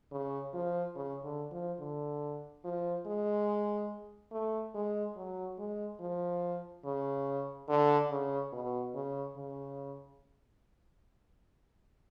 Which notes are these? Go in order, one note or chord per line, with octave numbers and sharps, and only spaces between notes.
C#3
F3
C#3
D3
F3
D3
F3
G#3
A3
G#3
F#3
G#3
F3
C#3
D3
C#3
B2
C#3
C#3